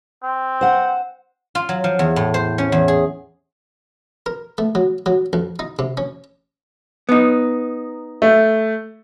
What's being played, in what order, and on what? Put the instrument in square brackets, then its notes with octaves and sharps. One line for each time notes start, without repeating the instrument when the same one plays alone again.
[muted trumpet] C4
[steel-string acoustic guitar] C5 F#5
[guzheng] F4
F#3
F3
E2
A2
C5
C#4
E2
G#4
[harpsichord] A#4
A3
F#3
F#3
F2
D#4
C3
C#4
[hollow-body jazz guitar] B3 D#4
[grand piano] A3